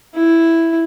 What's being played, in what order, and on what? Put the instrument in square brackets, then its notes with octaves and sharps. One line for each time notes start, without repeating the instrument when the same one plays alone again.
[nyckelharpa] E4